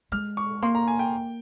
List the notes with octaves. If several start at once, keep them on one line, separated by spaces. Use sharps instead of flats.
G#3 F6
C#6
A#3 C6
A#5
G#5
G5